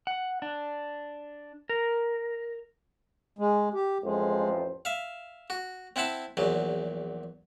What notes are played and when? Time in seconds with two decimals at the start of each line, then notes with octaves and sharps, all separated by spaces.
0.07 F#5
0.42 D4
1.69 A#4
3.39 G#3
3.74 G4
4.04 A1 F2 G#3 C5
4.85 E5 F5
5.50 F#4
5.96 C4 E4 F#5 A5 B5
6.37 A#1 E2 F#3